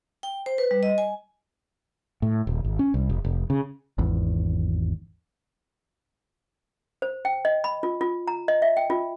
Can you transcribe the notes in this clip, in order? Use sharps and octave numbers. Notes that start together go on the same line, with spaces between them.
G5
C5
B4
G3
D#5
G#5
A2
D#1
G#1
C#4
C2
F1
F1
C#3
G#1 E2
C5
G5
D#5
B5
F4
F4
A#5
D#5
E5
G5
F4